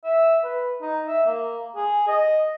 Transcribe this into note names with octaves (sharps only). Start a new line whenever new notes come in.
E5
B4
D#4
E5
A#3
G#4
D#5